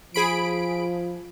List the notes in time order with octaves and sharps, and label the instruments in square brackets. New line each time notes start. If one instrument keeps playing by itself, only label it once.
[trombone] F3 [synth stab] G#4 B5 D7